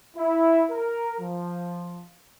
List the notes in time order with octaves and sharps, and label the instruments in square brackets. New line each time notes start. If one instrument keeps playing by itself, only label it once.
[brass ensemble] E4
A#4
F3